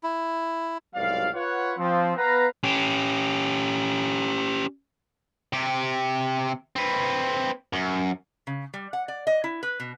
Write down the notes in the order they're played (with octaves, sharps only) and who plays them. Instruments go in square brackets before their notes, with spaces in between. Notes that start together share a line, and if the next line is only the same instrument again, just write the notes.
[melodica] E4
[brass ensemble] C2 G#2 B2 F#3 D5 F5
F4 B4 C#5 F#5
F3 C4
B3 B4 F5 A#5
[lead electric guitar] C#4 G4
[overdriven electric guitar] C3 G4
C4 B4
F#2
[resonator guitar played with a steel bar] C#3
G3
F#5
D5
D#5
E4
B4
B2